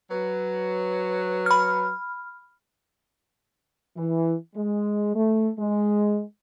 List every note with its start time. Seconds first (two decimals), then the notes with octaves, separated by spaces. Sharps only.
0.10 F#3 B4
1.46 B5 F6
3.97 E3
4.56 G#3
5.15 A3
5.59 G#3